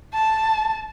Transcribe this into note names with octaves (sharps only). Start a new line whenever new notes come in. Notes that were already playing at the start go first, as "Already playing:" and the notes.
A5